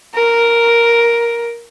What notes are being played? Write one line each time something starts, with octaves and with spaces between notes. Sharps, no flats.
A#4